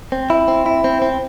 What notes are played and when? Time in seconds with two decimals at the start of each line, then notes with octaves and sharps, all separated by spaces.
0.12 C4
0.30 E4
0.48 C4
0.66 E4
0.84 C4
1.02 C4